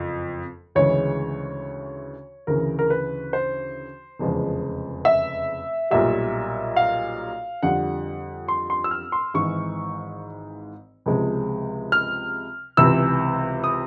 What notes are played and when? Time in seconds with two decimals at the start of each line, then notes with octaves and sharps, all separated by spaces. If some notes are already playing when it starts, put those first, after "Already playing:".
Already playing: F#1 F2
0.75 D2 C#3 E3 G#3 C#5
2.47 D2 C#3 E3 A#4
2.79 A#4
2.90 B4
3.33 C5
4.19 F1 E2 C#3 F3 G#3
5.05 E5
5.91 B1 A#2 G3 E5
6.76 F5
7.62 F2 D3 G3 F#5
8.48 C6
8.70 C6
8.84 E6
8.91 F6
9.12 C6
9.34 G#1 G#2 E3 C#6
11.06 C#2 C3 F3 G#3
11.92 F6
12.77 C#2 C3 E3 E6
13.64 D#6